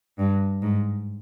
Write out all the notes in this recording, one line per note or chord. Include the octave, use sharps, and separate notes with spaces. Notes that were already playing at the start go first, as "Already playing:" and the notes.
G2
G#2